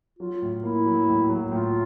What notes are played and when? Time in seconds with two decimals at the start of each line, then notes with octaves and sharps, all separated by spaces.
0.19 F#3 F4
0.42 A2
0.63 A#3 E4
0.86 F#3
1.08 A2
1.29 F#3
1.52 A2 F4